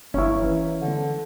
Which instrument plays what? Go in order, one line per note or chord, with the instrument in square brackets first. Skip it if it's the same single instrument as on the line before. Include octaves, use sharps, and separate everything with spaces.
[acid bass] G1 [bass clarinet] A#3 [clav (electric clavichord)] C#4 E4
[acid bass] E3
[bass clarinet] D3